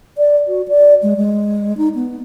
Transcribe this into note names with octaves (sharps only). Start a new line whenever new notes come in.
D5
F#4
D5
G#3
G#3
D#4
B3